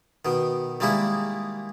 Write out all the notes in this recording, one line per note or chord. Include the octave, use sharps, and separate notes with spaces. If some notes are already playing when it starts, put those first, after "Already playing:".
B2 D#3
D#3 G3 G#3 A#3 E4